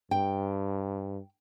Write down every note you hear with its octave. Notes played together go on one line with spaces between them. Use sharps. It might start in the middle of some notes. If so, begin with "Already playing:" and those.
G2 G5